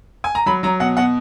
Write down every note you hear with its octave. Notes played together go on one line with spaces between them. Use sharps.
G#5
A#5
F#3 B5
F#3 A#5
B2 F#5
B2 F#5